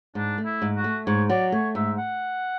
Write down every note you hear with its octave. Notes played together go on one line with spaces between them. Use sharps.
G#2 D4
A3
E4
G#2
F#4
A3
G#2 C#5
F#3 D5
A3 C#5
G#2 E5
F#5